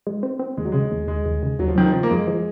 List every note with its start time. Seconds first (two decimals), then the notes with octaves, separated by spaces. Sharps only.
0.07 G#3
0.23 C4
0.39 C4
0.57 D#2 G#3
0.65 F#3
0.72 C#3 G#3
0.92 D#2
1.08 D#2 G#3
1.26 D#2
1.43 C#3
1.59 D#2 F#3
1.68 F3
1.76 D#3 F#3
1.86 F3
1.93 C#3
2.03 A#3
2.10 F#2 G#3
2.27 F3